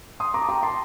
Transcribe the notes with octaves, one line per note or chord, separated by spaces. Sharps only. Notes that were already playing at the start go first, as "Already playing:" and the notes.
C6 D#6
A#5 D6
A5
G5 A#5
A5 C6